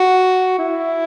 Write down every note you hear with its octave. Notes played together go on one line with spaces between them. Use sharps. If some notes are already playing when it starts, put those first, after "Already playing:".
Already playing: F#4
E4